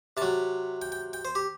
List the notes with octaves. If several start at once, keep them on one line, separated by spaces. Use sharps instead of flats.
C3 F#3 A5
G5
G5
G5
C5
G4